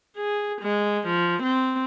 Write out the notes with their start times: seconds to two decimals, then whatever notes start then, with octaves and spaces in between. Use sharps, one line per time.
0.17 G#4
0.62 G#3
1.07 F3
1.43 C4